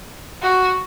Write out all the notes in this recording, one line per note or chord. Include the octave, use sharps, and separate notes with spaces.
F#4